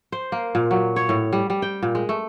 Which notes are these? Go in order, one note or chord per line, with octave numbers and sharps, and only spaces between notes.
C5
A#3
A#2
F#3
C#5
A2
G3
G3
G5
A#2
G#3
A3